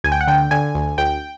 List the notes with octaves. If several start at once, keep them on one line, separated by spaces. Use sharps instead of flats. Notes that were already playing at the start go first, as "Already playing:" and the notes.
D2 G#5
G5
F#5
D3 G5
D3 G#5
D2
D2 G5